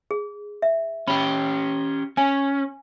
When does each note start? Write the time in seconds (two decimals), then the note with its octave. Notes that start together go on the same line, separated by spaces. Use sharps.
0.11 G#4
0.62 E5
1.08 C#4 G4 B5
2.17 C#4 G#5